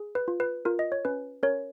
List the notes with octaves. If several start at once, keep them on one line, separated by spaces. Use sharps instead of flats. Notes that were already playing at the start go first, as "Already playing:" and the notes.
Already playing: G#4
B4
F4
B4
F4 A#4
D#5
C#5
C#4 B4
C#4 A#4 C#5